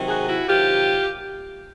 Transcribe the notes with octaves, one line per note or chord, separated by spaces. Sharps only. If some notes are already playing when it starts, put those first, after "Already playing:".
Already playing: C3 D#3 F#3
F#4 G#4
E4 F#4
C3 D#3 F#3 F4 G4